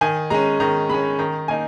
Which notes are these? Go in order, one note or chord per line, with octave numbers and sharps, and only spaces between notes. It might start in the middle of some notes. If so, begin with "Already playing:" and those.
D#3 G#5
G#3 C#4 A#5
D#3 A#5
G#3 C#4 B5
D#3 A#5
A#3 D#4 G#5